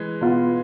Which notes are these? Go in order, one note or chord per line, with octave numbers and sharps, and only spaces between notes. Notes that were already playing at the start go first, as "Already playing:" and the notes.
Already playing: E3 G#3
B2 B3 F4